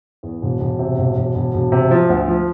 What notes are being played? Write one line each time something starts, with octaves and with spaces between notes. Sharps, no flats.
E2
E1
E1
C3
E1
E1
E1
E1
C3
F3
D2
F3